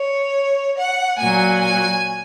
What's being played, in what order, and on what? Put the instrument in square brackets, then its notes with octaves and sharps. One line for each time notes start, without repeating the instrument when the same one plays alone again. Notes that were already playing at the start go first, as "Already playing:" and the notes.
Already playing: [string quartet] C#5
F#5
A#2 F#3 G#5
G#5